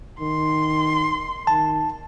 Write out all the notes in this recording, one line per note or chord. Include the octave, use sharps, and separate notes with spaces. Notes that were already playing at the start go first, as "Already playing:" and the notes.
D#3 C6
D#3 A5